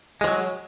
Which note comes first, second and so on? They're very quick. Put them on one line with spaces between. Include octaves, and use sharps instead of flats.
G#3 F3 F#3